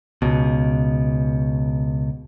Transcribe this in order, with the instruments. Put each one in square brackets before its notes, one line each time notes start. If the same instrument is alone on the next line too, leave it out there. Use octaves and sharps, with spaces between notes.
[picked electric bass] C#2 B2